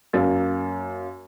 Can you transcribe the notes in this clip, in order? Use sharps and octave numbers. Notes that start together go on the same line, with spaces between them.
F#2 A#3 A6